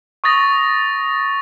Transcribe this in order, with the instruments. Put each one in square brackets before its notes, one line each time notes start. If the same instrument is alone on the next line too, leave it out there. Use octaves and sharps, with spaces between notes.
[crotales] C#6 D#6 A6 A#6